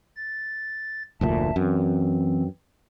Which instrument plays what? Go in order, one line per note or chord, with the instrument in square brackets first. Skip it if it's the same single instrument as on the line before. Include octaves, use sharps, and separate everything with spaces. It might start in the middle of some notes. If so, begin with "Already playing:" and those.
[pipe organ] A6
[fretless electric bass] F1 D2 A#2 [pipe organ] E5 A5
[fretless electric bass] F#2 [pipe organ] E3 C4